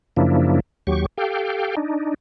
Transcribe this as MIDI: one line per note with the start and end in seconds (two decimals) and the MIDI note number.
0.17 0.60 42
0.17 0.60 49
0.17 0.60 53
0.17 0.60 58
0.17 0.60 62
0.17 0.60 64
0.87 1.06 39
0.87 1.06 54
0.87 1.06 67
0.87 1.06 85
1.18 1.75 67
1.18 1.75 69
1.18 1.75 77
1.18 1.75 79
1.77 2.14 62
1.77 2.14 63